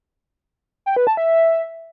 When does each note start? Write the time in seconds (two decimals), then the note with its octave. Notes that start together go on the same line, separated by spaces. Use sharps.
0.86 G5
0.96 B4
1.07 A5
1.17 E5